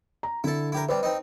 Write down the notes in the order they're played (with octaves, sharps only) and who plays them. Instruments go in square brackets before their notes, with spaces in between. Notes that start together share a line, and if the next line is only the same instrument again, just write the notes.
[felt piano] A#5
[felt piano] D3 [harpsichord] E4 A4
[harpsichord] E4 G4 A#4
[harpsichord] C3 G3 [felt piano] B4
[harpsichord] C4 D#4